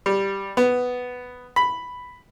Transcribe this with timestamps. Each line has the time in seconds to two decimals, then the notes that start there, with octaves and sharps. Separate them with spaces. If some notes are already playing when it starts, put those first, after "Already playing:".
0.06 G3
0.57 B3
1.56 B5